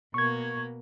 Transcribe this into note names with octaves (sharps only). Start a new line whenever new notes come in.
B2 A#3 C#6 G#6